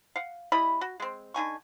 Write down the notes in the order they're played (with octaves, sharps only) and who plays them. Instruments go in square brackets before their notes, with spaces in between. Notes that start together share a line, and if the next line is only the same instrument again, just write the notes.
[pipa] F5 F#5
G3 E4 D#5 B5
F#4
G#3 C4
D3 D#4 G#5 C#6